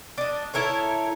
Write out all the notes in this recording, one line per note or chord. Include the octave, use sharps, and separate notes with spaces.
D4 D#5
E4 A4 A#4 C#5